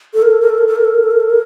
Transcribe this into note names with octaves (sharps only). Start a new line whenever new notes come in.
A4
A#4
A4
A#4
A4
A#4
A4
A#4
A4
A#4
A4
A#4
A4
A#4